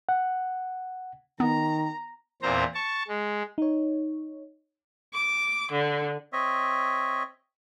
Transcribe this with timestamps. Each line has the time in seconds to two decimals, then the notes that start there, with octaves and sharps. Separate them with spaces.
0.09 F#5
1.40 D#3 B3 A#5
2.42 E2 A#2 C4 C5 A#5
2.74 A5 C#6
3.08 G#3
3.58 D#4 C#5
5.14 D6
5.71 D3
6.33 C4 C#5 D#5 E5